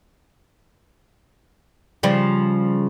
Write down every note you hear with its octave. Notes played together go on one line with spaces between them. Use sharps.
C#3 F3 G3